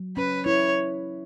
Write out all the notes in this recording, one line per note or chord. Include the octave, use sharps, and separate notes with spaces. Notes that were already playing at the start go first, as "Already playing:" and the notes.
Already playing: F#3
C#4 B4
E4 C#5